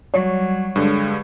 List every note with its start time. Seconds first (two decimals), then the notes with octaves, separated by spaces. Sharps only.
0.14 F#3 G3 C#5
0.76 G2 D3 G#3